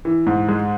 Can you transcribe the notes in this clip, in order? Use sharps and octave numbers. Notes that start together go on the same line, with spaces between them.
E3
G#2
G#3